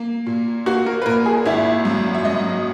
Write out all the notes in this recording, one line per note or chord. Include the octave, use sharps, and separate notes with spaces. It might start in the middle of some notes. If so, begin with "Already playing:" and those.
Already playing: A#3
A#2
A#3 F#4
A#4
B4
A#2 A#4
G#4
G#1 E4
F#2
E5
F#2 D#5